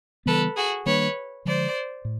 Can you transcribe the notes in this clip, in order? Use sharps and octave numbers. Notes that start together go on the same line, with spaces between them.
C#3 E3 G3 B3 A4 B4
F#4 G#4
D#3 G3 A#3 D4 B4 C#5
D3 F3 G#3 C5 D5
A2